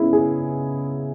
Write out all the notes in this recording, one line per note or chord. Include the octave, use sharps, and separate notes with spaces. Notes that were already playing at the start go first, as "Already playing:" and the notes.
Already playing: C#3 G#3 B3 E4
G#4